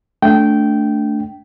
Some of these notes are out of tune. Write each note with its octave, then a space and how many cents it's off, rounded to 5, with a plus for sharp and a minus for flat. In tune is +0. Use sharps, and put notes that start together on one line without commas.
A3 +0 D4 -15 G5 -15